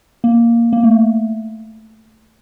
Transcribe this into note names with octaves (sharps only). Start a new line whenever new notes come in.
A#3
A#3
A3